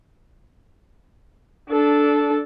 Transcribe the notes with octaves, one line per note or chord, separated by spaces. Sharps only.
D4 A4